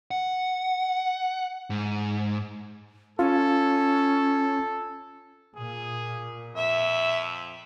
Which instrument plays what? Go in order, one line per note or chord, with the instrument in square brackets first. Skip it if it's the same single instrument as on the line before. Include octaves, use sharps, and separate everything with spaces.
[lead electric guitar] F#5
G#2
[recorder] C#4 [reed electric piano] F4 [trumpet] A4
[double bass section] A#2 [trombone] G#4
[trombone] F2 [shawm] E5